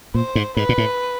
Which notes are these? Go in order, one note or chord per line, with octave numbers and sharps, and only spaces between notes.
A#2 C5
G#2
G#2 B4
A#2
A2